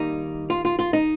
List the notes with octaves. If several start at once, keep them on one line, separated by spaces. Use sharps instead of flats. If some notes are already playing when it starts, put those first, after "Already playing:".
Already playing: D#3 G3 A#3 D#4
F4
F4
F4
D#4